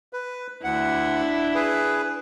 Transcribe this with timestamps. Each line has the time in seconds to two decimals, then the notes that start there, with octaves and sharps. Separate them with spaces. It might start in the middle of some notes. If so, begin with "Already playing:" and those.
0.13 B4
0.64 D2 D4 E4 F#5
1.55 G#4 B4